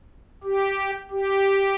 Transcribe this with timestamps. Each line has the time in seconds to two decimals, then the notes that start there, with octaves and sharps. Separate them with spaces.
0.44 G4
1.11 G4